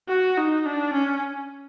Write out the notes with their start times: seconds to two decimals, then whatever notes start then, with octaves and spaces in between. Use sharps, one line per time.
0.09 F#4
0.37 D#4
0.65 D4
0.93 C#4